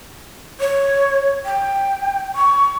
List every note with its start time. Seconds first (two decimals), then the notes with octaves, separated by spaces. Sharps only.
0.60 C#5
1.45 G5
2.36 C#6